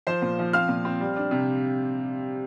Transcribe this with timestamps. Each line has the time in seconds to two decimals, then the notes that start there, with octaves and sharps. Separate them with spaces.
0.07 F3 C5 C6
0.22 A#2
0.39 F3
0.53 C4 F5 F6
0.69 A#2
0.85 C4
1.00 G3
1.16 D4
1.31 C3